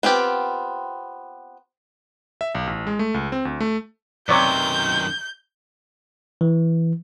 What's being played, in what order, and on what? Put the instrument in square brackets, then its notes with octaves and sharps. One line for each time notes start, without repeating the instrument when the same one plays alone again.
[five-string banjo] B3 C4 F4 G4
[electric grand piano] E5
B1
A1
G#3
A3
C#2
C4
D2
A3
[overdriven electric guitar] F#2 D#3 [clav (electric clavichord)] C3 F#3 B3 [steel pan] C#5 D5 [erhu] G6
[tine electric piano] E3